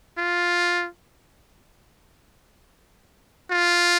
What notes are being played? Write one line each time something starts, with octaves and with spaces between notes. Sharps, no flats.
F4
F4